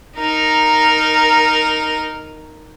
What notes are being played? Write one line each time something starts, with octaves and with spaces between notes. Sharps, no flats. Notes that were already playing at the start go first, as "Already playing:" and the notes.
D#4 A#4